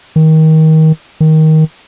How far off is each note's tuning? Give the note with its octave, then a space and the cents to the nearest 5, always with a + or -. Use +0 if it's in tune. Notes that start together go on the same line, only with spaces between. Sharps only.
D#3 +25
D#3 +15